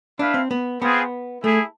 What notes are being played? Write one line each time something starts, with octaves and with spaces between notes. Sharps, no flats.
D4 E4 B4 F5
C4
B3
B3 C4 F4 G#4 B4
A3 E4 G#4